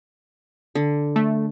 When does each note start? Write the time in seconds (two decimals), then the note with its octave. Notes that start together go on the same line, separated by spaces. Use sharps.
0.75 D3
1.16 A3